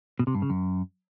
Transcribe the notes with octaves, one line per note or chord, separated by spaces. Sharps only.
B2
C3
G2
C#3
F#2